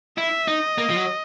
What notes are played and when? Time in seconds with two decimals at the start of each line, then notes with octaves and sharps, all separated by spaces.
0.18 E4 E5
0.48 D#4 D#5
0.78 A#3
0.90 F3
0.97 F#3